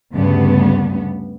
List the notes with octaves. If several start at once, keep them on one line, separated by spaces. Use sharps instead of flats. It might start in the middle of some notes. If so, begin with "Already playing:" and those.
D2 G2 C#3 G3 B3